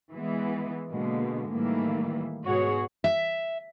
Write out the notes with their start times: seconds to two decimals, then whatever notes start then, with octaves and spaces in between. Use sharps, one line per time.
0.13 E3 G#3 B3
0.91 B2 D3 G#3 A#3
1.51 A2 D#3 E3 G3 A3 A#3
2.45 G#2 B2 F#4 G#4 C#5
3.04 E5